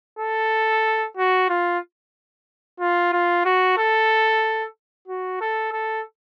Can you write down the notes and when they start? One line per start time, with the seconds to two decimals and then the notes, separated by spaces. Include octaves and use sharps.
0.19 A4
1.17 F#4
1.49 F4
2.80 F4
3.13 F4
3.45 F#4
3.78 A4
5.08 F#4
5.41 A4
5.73 A4